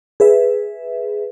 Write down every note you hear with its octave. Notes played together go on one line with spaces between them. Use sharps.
G#4 B4 E5